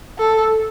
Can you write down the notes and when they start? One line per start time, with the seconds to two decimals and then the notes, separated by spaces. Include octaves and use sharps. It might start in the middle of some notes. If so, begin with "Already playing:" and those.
0.19 A4